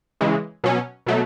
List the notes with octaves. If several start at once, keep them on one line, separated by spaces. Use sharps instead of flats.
C#3 E3 G#3
B2 F#3 C#4
B2 F#3 A3